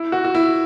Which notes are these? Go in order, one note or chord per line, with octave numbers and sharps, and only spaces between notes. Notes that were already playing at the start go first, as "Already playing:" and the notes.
Already playing: E4
F#4
F#4
E4